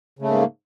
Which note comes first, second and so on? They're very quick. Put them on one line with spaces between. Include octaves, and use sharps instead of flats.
C#3 A3 G#2 A#3